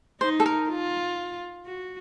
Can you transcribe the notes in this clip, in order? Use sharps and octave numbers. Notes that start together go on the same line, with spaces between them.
D#4 C5
A4
A#4
F4
F#4